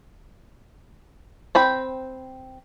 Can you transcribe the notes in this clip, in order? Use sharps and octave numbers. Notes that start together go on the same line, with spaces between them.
C4 G5 B5